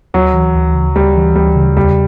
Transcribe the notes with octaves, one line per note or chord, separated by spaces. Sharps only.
D2 F#3
E3
D2
C#3
D2 G3
E3
D2 G3
C#3
E2 G3